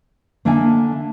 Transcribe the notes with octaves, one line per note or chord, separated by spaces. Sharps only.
D3 A#3 D4 A4 E5 G#5